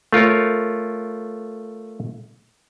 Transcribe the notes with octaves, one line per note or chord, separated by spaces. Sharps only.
A3 F4 A#4 C#5